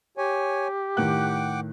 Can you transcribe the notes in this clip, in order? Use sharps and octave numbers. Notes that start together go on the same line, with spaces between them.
G4 C#5 G#5
A2 D#3 F#5 G5 D6 F#6